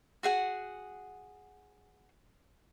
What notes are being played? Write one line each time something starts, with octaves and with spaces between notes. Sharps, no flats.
F#4 G#4 F#5